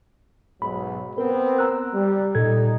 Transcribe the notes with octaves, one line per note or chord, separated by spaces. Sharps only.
B1 G#2 F#3 B5
B3 C4 A#4
A#5 E6 F#6
G3
A#2 G3 D#4 A4 G#6